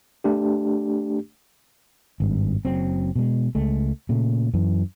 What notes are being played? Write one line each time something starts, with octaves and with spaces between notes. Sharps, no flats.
A3 D4 G4
G#1 G2
F#1 F#3 C4
B2 G#3
C#2 G#3 A3
A#2 C#3 A3
F#2 E3